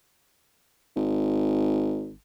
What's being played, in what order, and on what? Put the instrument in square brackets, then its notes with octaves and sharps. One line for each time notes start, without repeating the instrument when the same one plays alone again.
[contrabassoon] G#1